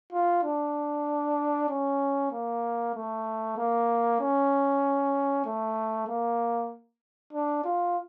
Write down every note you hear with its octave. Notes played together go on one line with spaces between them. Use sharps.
F4
D4
C#4
A#3
A3
A#3
C#4
A3
A#3
D4
F4